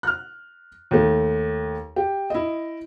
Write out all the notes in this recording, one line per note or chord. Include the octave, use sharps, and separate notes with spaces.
F6 F#6
D#2 A3
G4
E4 D#5